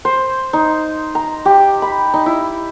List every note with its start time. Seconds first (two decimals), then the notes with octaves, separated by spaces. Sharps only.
0.05 C5
0.53 D#4
1.15 A#5
1.45 G4
1.82 B5
2.14 D#4
2.26 E4